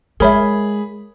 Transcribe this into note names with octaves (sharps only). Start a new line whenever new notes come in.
G#3 G#4 A#4 C#5 E5 B5